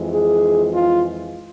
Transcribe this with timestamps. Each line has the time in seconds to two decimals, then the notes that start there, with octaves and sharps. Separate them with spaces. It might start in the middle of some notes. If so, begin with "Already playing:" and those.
Already playing: F2 E3 G#3
0.12 G#4
0.72 F4